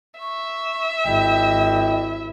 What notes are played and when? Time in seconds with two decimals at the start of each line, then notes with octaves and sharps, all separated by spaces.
0.20 E5 C#6
1.05 G#1 E4 D#5 G5